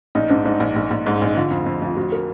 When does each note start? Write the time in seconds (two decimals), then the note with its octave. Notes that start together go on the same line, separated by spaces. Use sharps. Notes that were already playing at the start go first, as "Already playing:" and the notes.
0.15 A#1 D#4
0.29 G#2 D4
0.45 G#2 D#4
0.60 A#1
0.76 A#1
0.91 A#1
1.06 G#2 D#4
1.22 A#1 D#4
1.36 D3 F4
1.51 F2
1.66 F2
1.82 F2 F4
1.97 F2 F#4
2.12 A#4